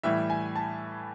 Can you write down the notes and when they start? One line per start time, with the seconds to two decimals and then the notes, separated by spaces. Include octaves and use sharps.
0.03 A2 E3 G3 E5
0.30 G#5
0.56 A5